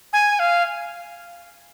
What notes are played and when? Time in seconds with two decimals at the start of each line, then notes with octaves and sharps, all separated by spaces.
0.13 G#5
0.39 F5